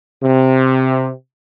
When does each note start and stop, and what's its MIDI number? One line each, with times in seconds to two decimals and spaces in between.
0.23 1.10 48